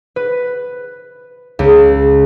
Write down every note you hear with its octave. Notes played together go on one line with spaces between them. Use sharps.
B4
C#2